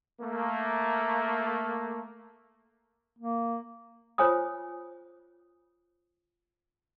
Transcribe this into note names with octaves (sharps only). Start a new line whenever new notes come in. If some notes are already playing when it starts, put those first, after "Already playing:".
A3 A#3
A#3
F4 C5 C#5 G#5 D6 D#6